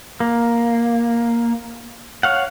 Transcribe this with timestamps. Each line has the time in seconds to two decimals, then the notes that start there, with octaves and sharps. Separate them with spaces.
0.20 A#3
2.23 C#5 F5 F#5